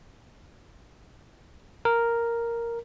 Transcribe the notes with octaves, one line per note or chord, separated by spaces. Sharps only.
A#4